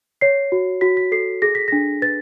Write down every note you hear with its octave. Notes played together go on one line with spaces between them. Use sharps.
C#5 C7
F#4
F#4 B6
B6
A4 C7
G#4 A#6
B6
D4 A#6
B4 A6